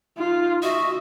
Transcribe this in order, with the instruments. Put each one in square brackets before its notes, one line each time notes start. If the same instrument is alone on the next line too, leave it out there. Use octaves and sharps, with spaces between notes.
[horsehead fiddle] D#4 F4
[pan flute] F#4 [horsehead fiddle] D#5 E5